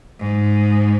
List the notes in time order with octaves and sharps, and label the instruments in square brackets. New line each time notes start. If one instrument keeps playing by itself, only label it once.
[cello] G#2